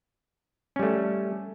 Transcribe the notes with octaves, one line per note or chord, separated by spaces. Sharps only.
G3 A3 C#4